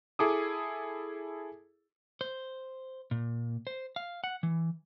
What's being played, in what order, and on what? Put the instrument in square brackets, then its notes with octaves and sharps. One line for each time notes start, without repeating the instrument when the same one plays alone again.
[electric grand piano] E4 G#4 A4 D6 D#6
[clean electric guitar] C5
A#2
C5
F5
F#5
E3